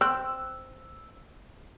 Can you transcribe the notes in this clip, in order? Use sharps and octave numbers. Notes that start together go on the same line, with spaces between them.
C4 E6 F#6